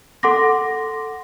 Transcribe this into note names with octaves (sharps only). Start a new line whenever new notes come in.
A4 F#5 C6 D6 A#6